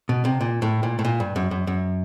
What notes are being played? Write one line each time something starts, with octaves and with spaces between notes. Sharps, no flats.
B2
C3
A#2
A2
A#2
A2
A#2
G2
F#2
F#2
F#2